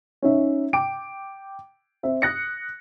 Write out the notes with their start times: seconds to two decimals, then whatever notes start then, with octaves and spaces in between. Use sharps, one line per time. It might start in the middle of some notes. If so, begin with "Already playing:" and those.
0.22 C#4 D#4 C#5 E5
0.73 G5 D6 D7
2.03 C4 E5
2.22 D#6 F#6 A#6 C#7